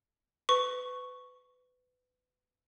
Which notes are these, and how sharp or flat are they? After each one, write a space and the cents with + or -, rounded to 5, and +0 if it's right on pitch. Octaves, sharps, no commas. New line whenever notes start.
B4 +25 C#6 +0